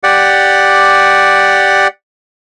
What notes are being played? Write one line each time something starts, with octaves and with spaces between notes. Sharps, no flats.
G4 D5 F#5